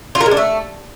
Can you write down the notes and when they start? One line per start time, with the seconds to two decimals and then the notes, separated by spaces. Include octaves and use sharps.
0.15 F4
0.21 A#4
0.26 G#3
0.31 D4
0.37 A3